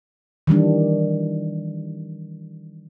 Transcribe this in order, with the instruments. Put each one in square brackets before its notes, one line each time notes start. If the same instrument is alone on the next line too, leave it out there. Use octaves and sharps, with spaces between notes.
[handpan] D#3 E3 G3 D4